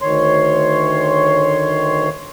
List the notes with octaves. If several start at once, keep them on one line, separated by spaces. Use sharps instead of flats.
D2 D#3 C#5 C6